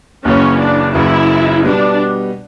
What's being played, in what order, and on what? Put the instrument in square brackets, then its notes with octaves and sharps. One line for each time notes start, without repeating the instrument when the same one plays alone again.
[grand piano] F#1 F#2 C#3 E3 [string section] C#4
[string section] D4
[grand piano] F#1 F#2 C#3 E3 [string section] E4
[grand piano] B2 G3 B3 [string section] D4